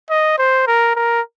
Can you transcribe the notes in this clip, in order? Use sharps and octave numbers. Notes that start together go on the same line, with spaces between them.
D#5
C5
A#4
A#4